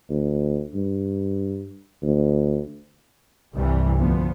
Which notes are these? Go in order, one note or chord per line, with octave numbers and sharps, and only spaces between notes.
D2
G2
D2
C2 G2 E3 G3
D2 F3 B3